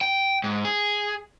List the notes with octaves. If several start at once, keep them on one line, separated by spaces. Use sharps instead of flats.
G5
G#2
G#4